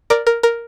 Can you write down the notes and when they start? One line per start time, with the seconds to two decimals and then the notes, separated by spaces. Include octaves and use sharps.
0.10 A#4 D5
0.27 A#4
0.43 A#4